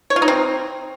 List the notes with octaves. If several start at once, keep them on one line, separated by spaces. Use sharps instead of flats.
C#5
F4
D#4
C4